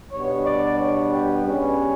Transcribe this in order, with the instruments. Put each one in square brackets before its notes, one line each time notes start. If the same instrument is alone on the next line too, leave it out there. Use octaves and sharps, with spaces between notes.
[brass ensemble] B2 G3 B3 D4 [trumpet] C#5
[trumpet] D5
C#5
G4
[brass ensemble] C#3 G3 C#4 [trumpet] B4